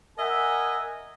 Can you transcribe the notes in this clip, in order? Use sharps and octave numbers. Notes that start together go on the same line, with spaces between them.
A#4 D#5 E5 F#5 G#5